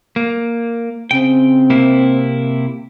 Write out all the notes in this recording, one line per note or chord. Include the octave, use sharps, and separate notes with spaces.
A#3
C#3 C4 G5
C3 A#3 E4